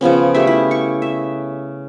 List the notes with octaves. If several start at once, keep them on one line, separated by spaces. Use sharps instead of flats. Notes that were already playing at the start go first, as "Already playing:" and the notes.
C#3 F3 B3 C#4
A3 G4 E5
E4
C#6
E5